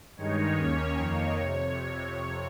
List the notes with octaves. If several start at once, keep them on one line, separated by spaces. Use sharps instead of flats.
G2 D#3 G#3 D#4 C#5
D#2 D#3 A#3 C#4
F2 D#3 A#3 D#4
F2 C3